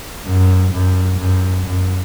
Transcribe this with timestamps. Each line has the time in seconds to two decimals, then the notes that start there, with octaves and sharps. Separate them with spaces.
0.26 F#2
0.72 F#2
1.19 F#2
1.67 F#2